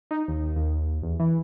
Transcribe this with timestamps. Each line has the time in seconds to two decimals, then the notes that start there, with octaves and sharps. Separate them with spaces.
0.11 D#4
0.28 D#2
0.56 D#2
1.02 E2
1.20 E3